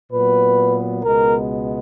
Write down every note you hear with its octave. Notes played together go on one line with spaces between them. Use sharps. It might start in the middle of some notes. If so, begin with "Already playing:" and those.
A#2 F#3 B3 B4
C#2 B2 G#3 B3 A#4